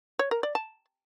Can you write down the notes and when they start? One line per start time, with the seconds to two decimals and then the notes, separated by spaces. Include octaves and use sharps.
0.19 C#5
0.31 A#4
0.43 D5
0.55 A5